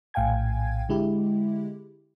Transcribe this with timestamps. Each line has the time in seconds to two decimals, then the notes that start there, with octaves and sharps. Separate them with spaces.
0.14 A#1 A2 F5 G5 G#5 G#6
0.89 D3 G#3 E4 G4